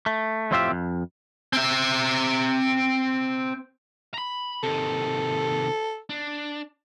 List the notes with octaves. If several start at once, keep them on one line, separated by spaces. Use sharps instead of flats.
A3
F2 A2 C4 F4 G4 E5
F2
C4 E5
A#5 B5
C3 D#3 A4
D4